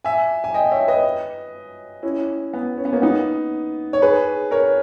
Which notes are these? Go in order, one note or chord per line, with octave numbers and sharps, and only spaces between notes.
E5 G#5
G#5
D#5 G5
C#5 E5
B4 D#5
C#4 E4
B3
C#4
B3
A#3 C#4
B3 D#4
C#5
G#4 B4
A#4 C#5